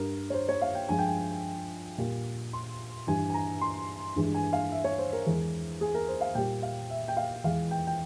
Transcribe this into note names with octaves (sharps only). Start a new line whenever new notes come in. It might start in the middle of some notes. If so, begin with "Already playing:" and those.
Already playing: G2 G3 A#4
C#5
C5
C#5
F5
G5
G2 F3 G#3 G#5
G5
G#5
A#2 G3
C6
G2 E3 G3 G#5
G#5
A#5
C6
G2 E3 G#3
G#5
F5
E5
C#5
C5
A#4
E2 E3 G#3
G#4
A#4
C5
F5
A#2 G3 G5
F5
E5
G5
F5
E2 E3 G#3 F5
G5
G5